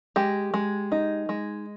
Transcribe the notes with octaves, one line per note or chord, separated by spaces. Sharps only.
G#3 G4
G#3
D#4
G#3